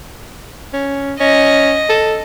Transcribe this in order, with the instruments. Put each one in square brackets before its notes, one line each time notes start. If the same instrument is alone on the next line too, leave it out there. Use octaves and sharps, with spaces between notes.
[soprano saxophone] C#4
[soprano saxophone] C#4 [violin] D#5
[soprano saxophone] A4